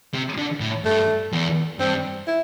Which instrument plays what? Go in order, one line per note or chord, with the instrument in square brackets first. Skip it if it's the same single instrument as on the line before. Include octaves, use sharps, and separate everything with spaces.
[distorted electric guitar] C3
D3
A2
[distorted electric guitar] G2 [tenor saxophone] A3
[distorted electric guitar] E2
[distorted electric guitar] G2 [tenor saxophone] C4
[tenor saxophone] E4